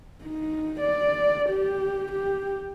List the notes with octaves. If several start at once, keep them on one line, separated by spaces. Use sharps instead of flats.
D#4
D5
G4
G4